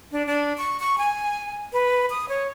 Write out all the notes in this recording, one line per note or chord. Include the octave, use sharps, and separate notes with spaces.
D4
D4
C#6
C#6
G#5
B4
D#6
C#5